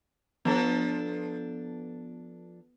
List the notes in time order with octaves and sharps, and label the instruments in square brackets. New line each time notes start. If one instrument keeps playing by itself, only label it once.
[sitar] F3 D4 A4 [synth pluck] B3